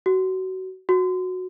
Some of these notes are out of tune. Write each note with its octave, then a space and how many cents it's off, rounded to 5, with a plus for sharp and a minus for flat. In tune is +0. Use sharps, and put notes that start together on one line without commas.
F#4 +25
F#4 -10